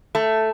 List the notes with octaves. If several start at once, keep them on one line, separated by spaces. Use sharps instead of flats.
A3